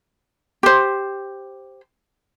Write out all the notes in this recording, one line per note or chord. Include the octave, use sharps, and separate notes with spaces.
G4 C5